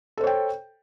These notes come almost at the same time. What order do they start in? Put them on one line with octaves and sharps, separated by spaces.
A4 C5 C#5 G5